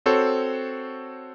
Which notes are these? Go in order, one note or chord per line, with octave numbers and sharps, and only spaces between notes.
C4 F#4 A4 C5 C#5